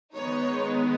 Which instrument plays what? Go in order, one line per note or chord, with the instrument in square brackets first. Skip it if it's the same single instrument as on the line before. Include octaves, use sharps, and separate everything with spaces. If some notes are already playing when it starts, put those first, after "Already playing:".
[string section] D#3 G#3 B3 D#4 C#5